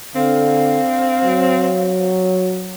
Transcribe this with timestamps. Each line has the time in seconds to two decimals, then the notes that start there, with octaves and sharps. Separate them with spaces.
0.15 D3 C4 F5
1.24 F#3